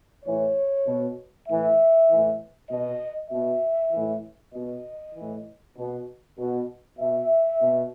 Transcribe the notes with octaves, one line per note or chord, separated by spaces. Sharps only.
A2 E3 C#5
B2
A2 E3 E5
A2 E3
B2 D#5
B2 E5
A2 E3
B2 D#5
A2 E3
B2
B2
B2 E5
B2